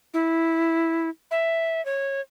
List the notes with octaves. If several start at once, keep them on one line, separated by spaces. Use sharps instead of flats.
E4
E5
C#5